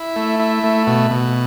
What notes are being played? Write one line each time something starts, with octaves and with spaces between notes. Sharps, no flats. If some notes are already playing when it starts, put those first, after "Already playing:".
Already playing: E4
A3
E4
A3
B2
B2